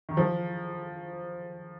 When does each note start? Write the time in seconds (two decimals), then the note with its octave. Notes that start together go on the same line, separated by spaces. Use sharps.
0.09 D#3
0.17 F3